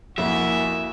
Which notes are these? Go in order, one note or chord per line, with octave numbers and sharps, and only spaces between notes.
F2 A#3 E4 F#4 E5 G#5